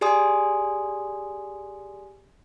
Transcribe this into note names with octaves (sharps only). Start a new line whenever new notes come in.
G4 G#4 D5 G#5 C6 D#6